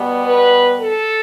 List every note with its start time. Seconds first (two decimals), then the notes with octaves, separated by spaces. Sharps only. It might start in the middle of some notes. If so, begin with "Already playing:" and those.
Already playing: B2 G3 B3
0.25 B4
0.81 A4